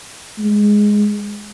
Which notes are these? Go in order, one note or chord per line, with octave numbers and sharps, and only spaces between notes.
G#3